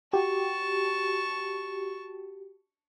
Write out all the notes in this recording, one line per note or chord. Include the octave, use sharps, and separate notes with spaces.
F#4 G4 A5 C#6